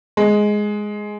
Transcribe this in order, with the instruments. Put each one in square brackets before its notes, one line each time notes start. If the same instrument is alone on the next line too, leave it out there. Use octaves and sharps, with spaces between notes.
[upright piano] G#3